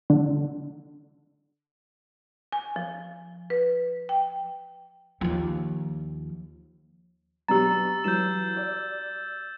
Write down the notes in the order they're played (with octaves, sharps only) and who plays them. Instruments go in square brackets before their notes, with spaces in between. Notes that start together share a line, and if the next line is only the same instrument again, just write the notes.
[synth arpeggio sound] D3
[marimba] G#5
F3
B4
G5
[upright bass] D#2 F3
[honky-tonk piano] B2 F#3 D4 [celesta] G4 A#5 [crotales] E6 A6
[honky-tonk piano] E3 F#3 [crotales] G6 E7
[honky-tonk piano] D5